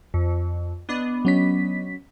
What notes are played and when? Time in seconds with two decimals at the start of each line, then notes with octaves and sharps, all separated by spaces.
0.14 F2
0.89 B3 D4 D#5
1.25 F#3 C#4 B6